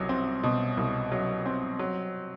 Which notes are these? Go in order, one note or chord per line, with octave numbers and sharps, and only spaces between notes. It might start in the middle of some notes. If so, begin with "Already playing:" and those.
Already playing: C2 B2 F#3
C4
B2
C2
F#3
C4
F#3